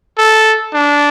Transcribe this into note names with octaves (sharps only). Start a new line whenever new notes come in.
A4
D4